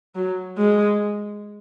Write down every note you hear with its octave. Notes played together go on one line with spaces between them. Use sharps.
F#3
G#3